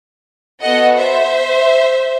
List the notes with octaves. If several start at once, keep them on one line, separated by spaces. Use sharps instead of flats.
B3 F#4 A4 D#5 F#5
C5 E5